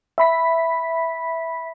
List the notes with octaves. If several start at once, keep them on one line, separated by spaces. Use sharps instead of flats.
E5 B5 B6